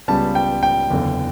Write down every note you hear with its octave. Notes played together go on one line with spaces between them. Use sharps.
C#2 C#3 G3 B3 A5
G5
G5
F#1 E2 D3